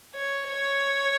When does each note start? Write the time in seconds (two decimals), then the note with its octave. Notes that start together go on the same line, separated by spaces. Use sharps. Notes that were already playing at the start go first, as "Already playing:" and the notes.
0.14 C#5
0.48 C#5